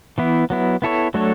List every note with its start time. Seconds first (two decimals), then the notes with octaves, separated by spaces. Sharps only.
0.18 E3 B3 E4
0.50 F#3 B3 E4
0.82 B3 E4 A4 C#5
1.14 F#3 A3 D4 A4 C#5